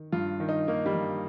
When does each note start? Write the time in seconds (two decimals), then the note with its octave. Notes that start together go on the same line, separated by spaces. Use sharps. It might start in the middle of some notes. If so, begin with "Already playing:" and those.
Already playing: D#3
0.12 G2 F4
0.40 D#3
0.49 D#4
0.68 D#3 A#3
0.86 G3
0.94 G2